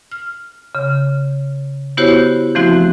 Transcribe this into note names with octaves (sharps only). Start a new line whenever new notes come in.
F6
C#3
B3 E4 F#4 G4 C5 C#5
E3 F3 A3 C4 E4 F#4